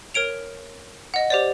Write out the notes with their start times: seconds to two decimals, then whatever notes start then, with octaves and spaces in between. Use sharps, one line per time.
0.14 A#4 C#5 D7 F7
1.14 D#5 F#5
1.30 G4 C5 D5